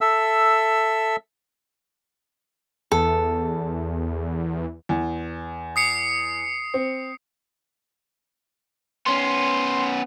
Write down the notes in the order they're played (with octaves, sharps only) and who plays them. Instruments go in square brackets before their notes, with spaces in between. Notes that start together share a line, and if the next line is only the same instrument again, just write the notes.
[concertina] A4 E5 E6
[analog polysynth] E2 [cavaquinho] A4
[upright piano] E2
[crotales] D#6 C7 C#7
[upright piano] C4
[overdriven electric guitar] B3 C#4 [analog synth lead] C6